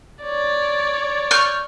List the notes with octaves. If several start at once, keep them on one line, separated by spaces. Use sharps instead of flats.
C#5 D5
C#6 F6 G6